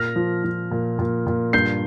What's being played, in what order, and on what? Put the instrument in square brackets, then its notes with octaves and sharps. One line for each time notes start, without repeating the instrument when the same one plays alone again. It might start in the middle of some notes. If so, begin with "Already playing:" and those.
Already playing: [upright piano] A#2 F6 A#6
F3
F3
A#2
A#2
A#2
G2 G6 C7